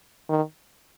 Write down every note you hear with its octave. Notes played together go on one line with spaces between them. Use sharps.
D#3